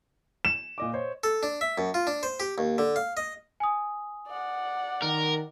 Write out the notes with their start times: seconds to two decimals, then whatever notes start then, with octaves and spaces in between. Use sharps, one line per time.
0.45 E7
0.78 A#2 D#5 D6
0.94 C5 C#5 D#5
1.24 A4
1.43 D4
1.61 E5
1.78 F#2
1.94 F4
2.07 D4
2.23 C5
2.40 G4
2.58 D#2
2.78 D3
2.96 F5
3.17 D#5
3.60 G#5 D#6
4.28 D5 F#5
5.02 D#3 A#4